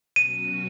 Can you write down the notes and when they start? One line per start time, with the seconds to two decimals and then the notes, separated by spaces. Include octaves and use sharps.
0.16 B2 F#3 C#4 F#4 D#7